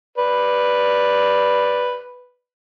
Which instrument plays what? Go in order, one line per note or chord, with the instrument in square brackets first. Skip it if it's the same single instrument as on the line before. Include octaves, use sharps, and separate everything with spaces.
[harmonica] B4 D5